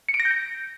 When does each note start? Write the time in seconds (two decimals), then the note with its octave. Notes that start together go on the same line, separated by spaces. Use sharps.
0.09 C#7
0.14 D7
0.20 A#6
0.25 G6
0.31 A#6